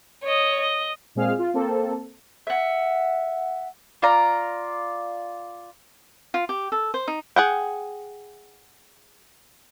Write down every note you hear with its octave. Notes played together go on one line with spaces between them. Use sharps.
C#5 D#5
D#5
A#2 G#3 C4 G#4 F5 F6
F4
A#3 C4 A4
E5 F#5
F4 D5 A#5
F4
G4
A4
C5
D#4
G#4 F#5 G5